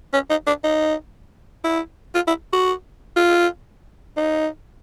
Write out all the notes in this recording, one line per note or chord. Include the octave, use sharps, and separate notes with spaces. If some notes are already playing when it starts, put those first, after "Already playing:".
C#4
D#4
D4
D#4
E4
F4
E4
F#4
F4
D#4